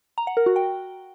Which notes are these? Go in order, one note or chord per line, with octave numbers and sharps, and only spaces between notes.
A#5
F#5
A#4
F#4
G5